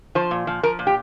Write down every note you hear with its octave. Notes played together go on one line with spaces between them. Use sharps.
F3 C5
A#2
F3
F3 A#4
A#2
G4